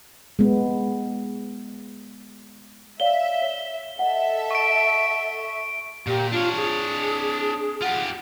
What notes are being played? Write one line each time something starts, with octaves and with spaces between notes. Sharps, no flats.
G#3 B3
C#5 D5 E5 F5 G7
C#5
A4 D#5 E5 F#5
C#6 D7
A#2 G4
D4 F4 C#5
G#4
F4 G4 F#5